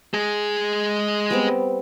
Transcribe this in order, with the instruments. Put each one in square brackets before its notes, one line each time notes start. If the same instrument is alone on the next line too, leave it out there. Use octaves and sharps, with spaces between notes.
[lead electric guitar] G#3 G#4
[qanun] G3 B3 C4